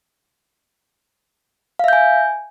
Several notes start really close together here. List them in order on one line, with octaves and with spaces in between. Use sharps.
F5 E5 G6 G#5